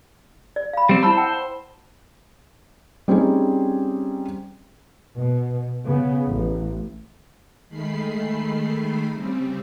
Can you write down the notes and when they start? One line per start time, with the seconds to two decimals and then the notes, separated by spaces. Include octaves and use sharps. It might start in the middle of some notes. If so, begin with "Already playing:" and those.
0.56 D5
0.73 F5 B5
0.89 G3 C4
1.03 E4 C5 A5 B5 E6
1.17 F#5 G5 A5
3.08 G3 C4 C#4 D#4 G#4
5.19 B2
5.85 C#3 B3
6.27 A1
7.70 D#3 G#3 A3 B5 C7
9.12 C#3 G3 C4